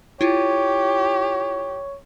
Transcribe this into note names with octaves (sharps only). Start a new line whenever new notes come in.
E4 F4 G4 C#5